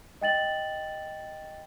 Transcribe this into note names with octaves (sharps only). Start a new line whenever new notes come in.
D#5 G5 A6 F#7